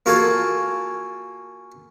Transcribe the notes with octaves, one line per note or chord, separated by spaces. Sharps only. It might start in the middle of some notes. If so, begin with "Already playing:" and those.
A#3 F4 F#4 G#4 A4 G#5